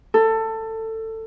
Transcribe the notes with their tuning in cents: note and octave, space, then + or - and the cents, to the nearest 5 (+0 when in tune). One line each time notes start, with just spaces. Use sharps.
A4 +20